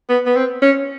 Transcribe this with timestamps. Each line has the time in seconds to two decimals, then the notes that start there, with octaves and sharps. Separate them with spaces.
0.09 B3
0.26 B3
0.36 C4
0.62 C#4